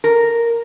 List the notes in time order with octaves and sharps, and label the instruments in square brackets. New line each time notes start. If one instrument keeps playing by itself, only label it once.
[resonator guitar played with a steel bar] A#4